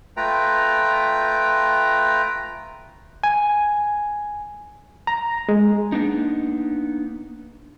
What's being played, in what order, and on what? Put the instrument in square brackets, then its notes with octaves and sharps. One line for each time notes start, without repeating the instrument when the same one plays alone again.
[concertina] A3 F4 B4 G5 A#5
[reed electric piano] G#5
A#5
G#3
[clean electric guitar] A#3 B3 D4 D#4